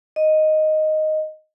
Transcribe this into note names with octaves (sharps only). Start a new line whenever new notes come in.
D#5